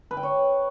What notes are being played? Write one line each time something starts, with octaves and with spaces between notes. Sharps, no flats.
B4
G5
C#5